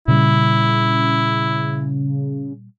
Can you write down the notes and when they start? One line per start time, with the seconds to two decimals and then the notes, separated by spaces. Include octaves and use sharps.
0.08 A#2 C#3 G3 E4